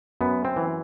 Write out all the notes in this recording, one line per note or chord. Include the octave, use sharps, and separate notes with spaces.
F#2 B3
C4
E3